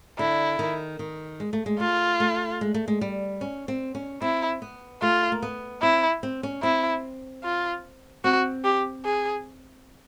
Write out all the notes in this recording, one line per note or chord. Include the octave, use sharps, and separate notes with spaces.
D3 E4
D#3
D#3
G#3
A3
G#3
A3 F4
A3
G#3
A3
G#3
G3
C#4
C4
C#4
C4 E4
B3
A3 F4
A#3
B3
C4 E4
C4
C#4
C4 E4
F4
C4 F#4
G4
G#4